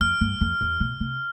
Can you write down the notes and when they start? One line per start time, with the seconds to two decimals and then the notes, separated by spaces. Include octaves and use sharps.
0.01 F2 F6
0.21 G2
0.41 F2
0.61 E2
0.80 B2
1.00 C3